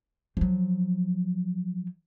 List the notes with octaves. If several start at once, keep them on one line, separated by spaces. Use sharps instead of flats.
F3 F#3